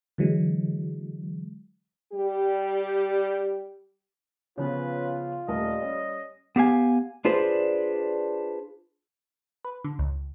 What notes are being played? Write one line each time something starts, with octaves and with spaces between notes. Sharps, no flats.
D3 E3 F#3 G#3
G3 G4
C#3 F3 B3 C#4 F4 B4
D#1 G3 A3 A#4 D#5
C#4
B3 G4 F5 G#5
D4 F4 G#4 B4 C5 D5
B4
D3
C#2